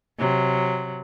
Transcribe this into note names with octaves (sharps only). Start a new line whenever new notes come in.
C3 F#3